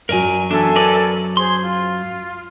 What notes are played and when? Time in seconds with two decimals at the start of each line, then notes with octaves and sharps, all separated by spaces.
0.09 F#2 F#3 A#4 D5 G#5
0.51 E2 D4 A4 E5 G#5
0.76 A#4 B4 D5
1.37 G#4 C5 C6
1.62 F4